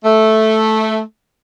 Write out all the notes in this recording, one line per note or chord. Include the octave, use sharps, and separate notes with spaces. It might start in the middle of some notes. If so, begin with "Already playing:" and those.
A3